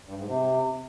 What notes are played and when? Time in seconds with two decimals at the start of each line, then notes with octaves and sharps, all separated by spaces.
0.05 G2
0.16 G#2
0.27 C3